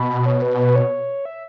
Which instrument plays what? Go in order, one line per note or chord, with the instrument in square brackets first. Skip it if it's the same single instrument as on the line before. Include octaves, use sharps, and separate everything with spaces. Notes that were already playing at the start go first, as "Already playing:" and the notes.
Already playing: [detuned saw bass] B2 [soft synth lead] B5
[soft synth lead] C#5
B4
B4
C#5
E5